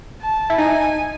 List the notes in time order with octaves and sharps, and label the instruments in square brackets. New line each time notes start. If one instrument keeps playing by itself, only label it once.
[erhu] A5
[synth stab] E4
[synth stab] D#4 [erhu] G#5